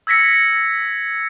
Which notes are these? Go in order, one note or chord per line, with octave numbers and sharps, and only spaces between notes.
E6 G#6 A#6 B6 C#7